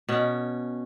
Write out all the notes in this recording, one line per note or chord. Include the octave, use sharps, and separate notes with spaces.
B2 C#4